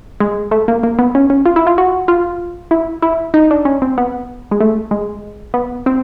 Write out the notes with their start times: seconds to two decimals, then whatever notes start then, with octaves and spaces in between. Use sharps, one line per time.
0.20 G#3
0.51 A3
0.68 A#3
0.83 A#3
0.99 B3
1.15 C#4
1.30 C#4
1.46 F4
1.56 E4
1.67 F4
1.78 F#4
2.08 F4
2.71 E4
3.02 E4
3.34 D#4
3.51 D4
3.65 C#4
3.82 C4
3.98 B3
4.51 G#3
4.61 A3
4.91 G#3
5.54 B3
5.86 C4